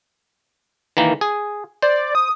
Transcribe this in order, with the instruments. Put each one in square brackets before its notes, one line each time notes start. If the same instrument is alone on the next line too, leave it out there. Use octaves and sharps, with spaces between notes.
[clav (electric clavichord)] D#3 E3 A#3
G#4
[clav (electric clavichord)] C5 [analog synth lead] D5
[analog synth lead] D#6